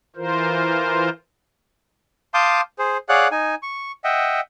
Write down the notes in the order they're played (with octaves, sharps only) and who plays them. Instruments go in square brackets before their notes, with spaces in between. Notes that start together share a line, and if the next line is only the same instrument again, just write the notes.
[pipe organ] E3 F4 A#4 C5
[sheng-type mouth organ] F5 A5 C6 D6 D#6 G6
G#4 C5
G#4 C#5 D5 F5 F#5 F#6
D#4 G#5
C#6
D#5 E5 F#5 G5